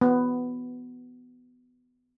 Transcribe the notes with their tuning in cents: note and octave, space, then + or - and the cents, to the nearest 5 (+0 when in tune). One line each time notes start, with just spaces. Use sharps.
B3 +15